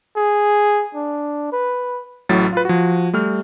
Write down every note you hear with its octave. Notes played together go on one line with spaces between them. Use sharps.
G#4
D4
B4
A1 A2 F#3 A6
F4 B4
F3 F#4
G3 A3 F6